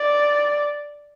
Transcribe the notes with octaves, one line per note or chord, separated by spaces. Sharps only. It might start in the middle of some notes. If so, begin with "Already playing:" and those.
Already playing: D5